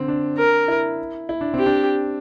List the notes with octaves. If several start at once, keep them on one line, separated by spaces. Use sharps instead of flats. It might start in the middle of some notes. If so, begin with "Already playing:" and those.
Already playing: D3 C4
D4
A#4
E4
E4
D4
C4
G4
D4